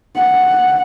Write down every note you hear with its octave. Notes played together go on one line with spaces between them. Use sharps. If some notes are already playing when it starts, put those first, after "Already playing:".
F#5